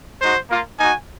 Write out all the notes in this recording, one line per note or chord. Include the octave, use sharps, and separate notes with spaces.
G#3 D#4 F#4 C5
A#3 F4
A#3 D#4 F#4 G#5